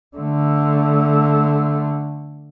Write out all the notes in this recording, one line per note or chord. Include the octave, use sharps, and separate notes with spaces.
D3 A3